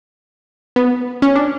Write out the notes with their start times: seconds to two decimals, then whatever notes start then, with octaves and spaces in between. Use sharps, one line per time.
0.76 B3
1.22 C#4
1.35 D4